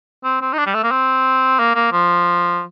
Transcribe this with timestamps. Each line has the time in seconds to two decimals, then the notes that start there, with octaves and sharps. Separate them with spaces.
0.24 C4
0.42 C4
0.53 D#4
0.58 D4
0.66 G3
0.75 A3
0.83 A#3
0.91 C4
1.59 A#3
1.75 A#3
1.92 F3